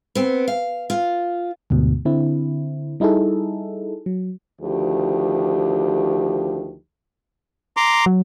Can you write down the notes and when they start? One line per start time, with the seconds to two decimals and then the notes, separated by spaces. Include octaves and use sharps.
0.15 B3 C4
0.48 F5
0.90 F4
1.70 D2 G#2 B2
2.05 D3 C4 E4
3.00 G3 D#4 E4 G#4 A4
4.06 F#3
4.62 D2 D#3 F3 G4
7.77 A#5 C6 D6
8.06 F#3